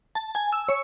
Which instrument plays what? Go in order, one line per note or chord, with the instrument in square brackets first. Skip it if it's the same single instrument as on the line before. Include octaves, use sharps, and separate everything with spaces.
[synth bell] A5
G#5
E6
C#5